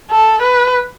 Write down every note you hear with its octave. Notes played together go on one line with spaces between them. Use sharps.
A4
B4